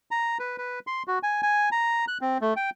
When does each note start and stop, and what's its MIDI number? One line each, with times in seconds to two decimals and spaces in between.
0.11 0.38 82
0.39 0.57 71
0.58 0.79 71
0.87 1.03 84
1.07 1.19 66
1.23 1.43 80
1.43 1.69 80
1.72 2.05 82
2.08 2.18 90
2.21 2.38 60
2.41 2.54 57
2.56 2.70 79